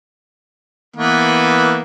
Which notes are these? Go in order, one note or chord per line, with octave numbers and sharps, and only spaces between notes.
E3 A#3 B3